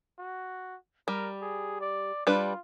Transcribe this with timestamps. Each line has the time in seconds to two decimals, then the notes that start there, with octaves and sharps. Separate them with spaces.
0.19 F#4
1.08 G3 A#4
1.42 G#4
1.81 D5
2.27 G3 D4 F4 B4